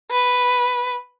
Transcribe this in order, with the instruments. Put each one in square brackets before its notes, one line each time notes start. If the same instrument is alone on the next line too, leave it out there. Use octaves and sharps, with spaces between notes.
[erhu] B4